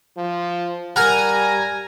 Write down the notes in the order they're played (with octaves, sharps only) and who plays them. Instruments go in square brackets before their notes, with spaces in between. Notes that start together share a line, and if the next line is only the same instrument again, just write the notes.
[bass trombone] F3
[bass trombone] G3 [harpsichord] A#4 F#5 [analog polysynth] G#5 A#5